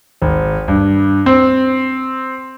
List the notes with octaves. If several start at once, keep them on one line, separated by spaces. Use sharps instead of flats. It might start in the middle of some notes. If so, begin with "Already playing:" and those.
G#1
G2
C4